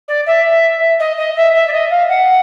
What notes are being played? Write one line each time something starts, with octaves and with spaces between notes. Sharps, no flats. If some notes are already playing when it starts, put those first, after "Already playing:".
D5
E5
D#5
D#5
E5
E5
D5
D#5
F5
F#5